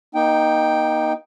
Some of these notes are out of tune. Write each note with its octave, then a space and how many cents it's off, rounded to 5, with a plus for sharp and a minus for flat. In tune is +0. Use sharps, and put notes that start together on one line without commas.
A#3 +30 D#4 +0 G5 +0